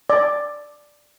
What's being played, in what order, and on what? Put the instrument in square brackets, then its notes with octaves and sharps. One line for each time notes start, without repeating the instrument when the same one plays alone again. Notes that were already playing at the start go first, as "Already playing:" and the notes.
[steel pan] D5